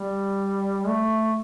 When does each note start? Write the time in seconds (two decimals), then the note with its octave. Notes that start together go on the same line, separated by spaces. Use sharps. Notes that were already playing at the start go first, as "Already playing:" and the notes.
Already playing: G3
0.87 A3